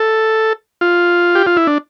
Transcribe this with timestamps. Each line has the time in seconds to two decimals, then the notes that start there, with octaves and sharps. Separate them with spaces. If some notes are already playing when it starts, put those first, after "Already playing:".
Already playing: A4
0.81 F4
1.35 G4
1.47 F4
1.57 E4
1.67 D4